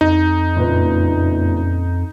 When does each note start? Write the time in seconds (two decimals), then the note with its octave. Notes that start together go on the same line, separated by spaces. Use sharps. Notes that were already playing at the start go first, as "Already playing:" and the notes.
0.01 F2 D#4
0.55 F#1 A#2 B4